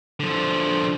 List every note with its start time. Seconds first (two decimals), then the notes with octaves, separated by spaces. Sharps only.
0.20 D3 F3